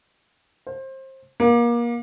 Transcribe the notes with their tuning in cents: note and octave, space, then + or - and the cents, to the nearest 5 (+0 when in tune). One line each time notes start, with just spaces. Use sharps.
C5 +25
A#3 +30